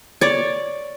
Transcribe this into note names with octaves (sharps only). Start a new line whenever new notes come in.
C#5 D5